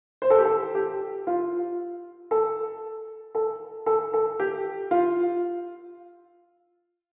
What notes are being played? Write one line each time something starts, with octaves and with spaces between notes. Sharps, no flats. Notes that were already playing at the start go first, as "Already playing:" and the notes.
C5
A4
G4
A4
G4
F4
A4
A4
A4
A4
G4
F4